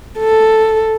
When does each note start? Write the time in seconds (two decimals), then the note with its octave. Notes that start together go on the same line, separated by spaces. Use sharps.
0.19 A4